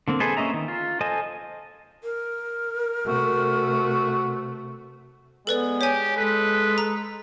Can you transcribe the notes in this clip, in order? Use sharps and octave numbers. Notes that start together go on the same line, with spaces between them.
D3 A#3 C4
G#4 A4 B4 C5 D#5
A#3 C#4 D#5 E5 A#5
D#3
F4
A4 C5 D#5 G#5 A5
A#4
C3 A3 F#4
G#3 B3 A4 B4 D5
G4 C#5 G#5
G#3 A4 B4
A#5